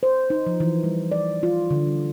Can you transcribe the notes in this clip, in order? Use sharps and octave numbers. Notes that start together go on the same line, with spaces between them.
C5
D#4
F3
E3
G3
D5
F4
D3
G3